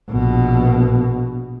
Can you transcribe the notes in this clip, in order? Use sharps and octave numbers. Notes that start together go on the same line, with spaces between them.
A#1 B2